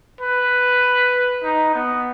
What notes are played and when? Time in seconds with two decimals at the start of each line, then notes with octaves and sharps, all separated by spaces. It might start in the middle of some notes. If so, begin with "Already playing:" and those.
0.21 B4
1.44 D#4
1.75 B3